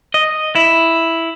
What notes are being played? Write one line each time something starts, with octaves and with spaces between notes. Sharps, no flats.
D#5
E4